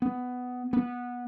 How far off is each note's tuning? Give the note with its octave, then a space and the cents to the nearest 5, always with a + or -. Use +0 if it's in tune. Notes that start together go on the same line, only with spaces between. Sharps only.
B3 +10
B3 -15